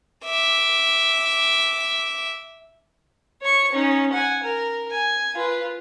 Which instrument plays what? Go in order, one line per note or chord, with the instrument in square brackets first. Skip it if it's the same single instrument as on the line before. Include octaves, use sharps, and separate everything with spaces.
[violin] E5 D6
[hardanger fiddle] C#5 C#6
C#4 D#4
F#5 G#5
A#4
G#5
F4 B4